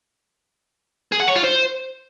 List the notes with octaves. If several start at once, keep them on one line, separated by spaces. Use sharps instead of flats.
G#4
F#5
C#5
F4
C5